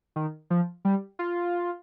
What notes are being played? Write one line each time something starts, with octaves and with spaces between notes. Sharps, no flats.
D#3
F3
G3
F4